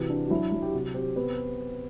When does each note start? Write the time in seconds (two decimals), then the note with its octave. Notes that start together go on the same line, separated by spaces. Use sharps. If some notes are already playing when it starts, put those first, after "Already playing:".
Already playing: C3 E3 F#4
0.09 D4
0.27 F#4
0.30 F#3 E4
0.52 F#3
0.62 G4
0.73 C3 F#4
0.94 C4 G4
1.16 B3